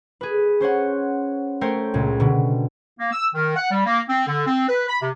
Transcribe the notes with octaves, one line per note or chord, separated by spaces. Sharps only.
G#4 B4
C#4 C5 C#5 F#5
A3 A#4 C5 C#5 G5
C#2 A#2
B2 D3
A#3
E6
D#3
F#5
G3
A#3
C4
D3
C4
B4
B5
C3